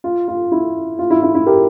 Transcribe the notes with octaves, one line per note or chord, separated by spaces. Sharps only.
F4
F4
E4
F4
E4
E4
E4
G4 A#4